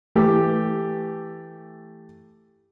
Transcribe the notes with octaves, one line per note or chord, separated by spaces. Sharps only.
E3 A3 G4